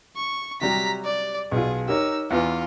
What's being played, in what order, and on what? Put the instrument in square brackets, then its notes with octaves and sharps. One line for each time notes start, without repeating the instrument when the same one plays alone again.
[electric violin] C#6
[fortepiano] C3 F#3 G3 [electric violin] A#5 B6
[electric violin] D5
[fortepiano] B1 F4 [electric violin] G#4
[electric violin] D#4 E6 [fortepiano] G4 A#4 C#5
[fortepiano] E2 E3 [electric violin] F4